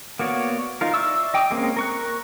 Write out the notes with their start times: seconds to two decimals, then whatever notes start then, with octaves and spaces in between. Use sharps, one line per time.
0.19 A#3 B3 F#4 C#5 D5
0.81 D#4 F4 A#4
0.94 D5 E5 C#6 E6
1.34 D#5 G5 D6 D#6
1.51 G#3 A#3 C4 C#4
1.77 A#4 C#6 F#6